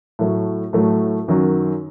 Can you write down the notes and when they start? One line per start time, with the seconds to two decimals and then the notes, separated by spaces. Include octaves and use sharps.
0.19 A2 F#3 A3
0.73 A2 F#3 A3
1.28 F#2 D#3 F#3